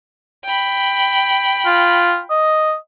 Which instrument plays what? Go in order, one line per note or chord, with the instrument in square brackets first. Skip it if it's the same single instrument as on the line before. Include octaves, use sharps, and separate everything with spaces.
[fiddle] G5 B5
[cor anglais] F4
D#5